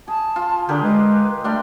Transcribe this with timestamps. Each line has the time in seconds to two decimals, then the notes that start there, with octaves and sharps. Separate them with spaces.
0.08 G#4 A5
0.36 F4
0.69 D3 D4 G4 G#4 A#4
0.83 G#3 B4
1.44 G3 A3 D4 C6